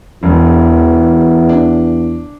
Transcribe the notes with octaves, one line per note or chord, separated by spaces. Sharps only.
E1 E2
D4